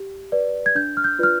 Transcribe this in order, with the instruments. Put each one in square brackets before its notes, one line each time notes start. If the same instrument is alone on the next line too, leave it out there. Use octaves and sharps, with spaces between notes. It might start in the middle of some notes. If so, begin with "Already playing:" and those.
Already playing: [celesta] G4
B4 D5
G#6
D4 G6
F6
G6
F4 B4 D5 F6